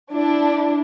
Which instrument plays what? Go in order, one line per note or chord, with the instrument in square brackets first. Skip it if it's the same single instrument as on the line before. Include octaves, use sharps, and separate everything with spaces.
[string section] D4 [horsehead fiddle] E4